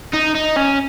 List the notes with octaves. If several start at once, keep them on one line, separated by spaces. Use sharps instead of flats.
D#4
D#4
C#4